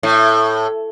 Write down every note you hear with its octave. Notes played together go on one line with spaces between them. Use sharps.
A2